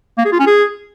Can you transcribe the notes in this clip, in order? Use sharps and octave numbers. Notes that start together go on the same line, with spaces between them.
A#3
G#4
F4
C#4
G#4